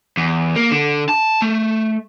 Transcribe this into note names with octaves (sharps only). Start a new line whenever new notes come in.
E2
A#3
D3
A5
A3